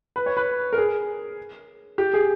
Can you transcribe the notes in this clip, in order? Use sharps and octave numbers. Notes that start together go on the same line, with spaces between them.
B4
C#5
B4
A#4
G#4
G4
G#4